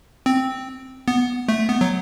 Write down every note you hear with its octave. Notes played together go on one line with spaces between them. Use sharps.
C4
B3
A3
B3
F#3